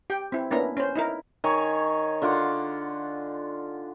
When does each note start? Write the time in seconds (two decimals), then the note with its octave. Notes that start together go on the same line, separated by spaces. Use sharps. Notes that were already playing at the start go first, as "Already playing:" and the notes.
0.10 G4 G5
0.32 C4 E4
0.51 A#3 B3 C#4 D4 E4 A#5
0.77 C#4 C5
0.96 D#4 E4 A#4
1.44 D#3 C#5 G#5
2.22 D3 F4 F#5 D6